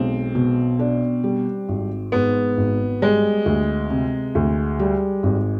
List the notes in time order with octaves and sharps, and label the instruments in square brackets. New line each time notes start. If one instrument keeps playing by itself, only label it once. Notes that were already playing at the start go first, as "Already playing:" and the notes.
Already playing: [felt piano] B1 G#3 [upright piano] C4
[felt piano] B2
D4
G3
G#1
[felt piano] G#2 [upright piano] B3
[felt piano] G#1
[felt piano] G3 [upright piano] G#3
[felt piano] D2
C3
D2
G3
G#1